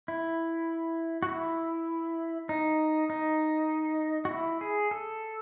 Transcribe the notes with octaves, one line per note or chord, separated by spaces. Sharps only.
E4
F#4
E4
D#4
D#4
F#4
E4
G#4
A4